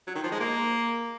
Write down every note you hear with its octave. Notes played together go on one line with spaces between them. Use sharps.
F#3
D#3
F3
G#3
A#3